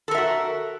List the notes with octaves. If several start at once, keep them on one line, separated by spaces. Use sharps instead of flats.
F#4 A4 A#4 E5